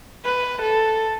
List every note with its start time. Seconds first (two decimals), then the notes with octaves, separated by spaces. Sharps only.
0.25 B4
0.62 A4